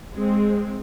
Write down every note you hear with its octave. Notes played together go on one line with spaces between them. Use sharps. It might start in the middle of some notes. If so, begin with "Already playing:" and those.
G#3 C4